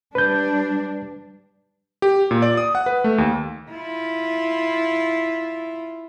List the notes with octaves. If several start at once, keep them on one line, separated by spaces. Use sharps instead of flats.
G3 D4 B4 G6
G4
A#2
D5
D#6
F#5
B4
A3
D#2
E4 F4